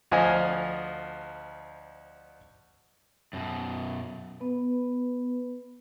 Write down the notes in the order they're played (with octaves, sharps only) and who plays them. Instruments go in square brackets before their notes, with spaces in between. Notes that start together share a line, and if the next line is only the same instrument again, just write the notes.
[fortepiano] D2 F3 D#5 F5 G#5
[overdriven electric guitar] F#2 B2
[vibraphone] B3 B4